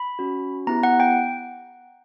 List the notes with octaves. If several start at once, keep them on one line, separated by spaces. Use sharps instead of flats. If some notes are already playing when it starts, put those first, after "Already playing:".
Already playing: B5
C#4 F#4
B3 E4 G4 A#5
F#5
G5